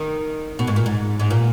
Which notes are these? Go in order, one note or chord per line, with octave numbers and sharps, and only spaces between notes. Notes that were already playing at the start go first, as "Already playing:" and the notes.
Already playing: D#3
B2
G#2
A#2
G#2
G#2
A#2